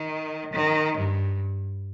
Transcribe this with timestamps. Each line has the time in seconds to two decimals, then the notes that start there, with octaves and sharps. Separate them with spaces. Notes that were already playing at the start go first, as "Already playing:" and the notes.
Already playing: D#3
0.52 D#3
0.97 G2